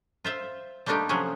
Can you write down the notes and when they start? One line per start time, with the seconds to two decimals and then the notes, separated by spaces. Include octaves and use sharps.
0.24 F4 C5 E5
0.86 G3 A3 A#3 D4 D#4 G4
1.09 C3 F3 F#3 C#4 G#4